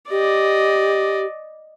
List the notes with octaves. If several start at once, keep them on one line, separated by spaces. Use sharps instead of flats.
G4 D5 D#5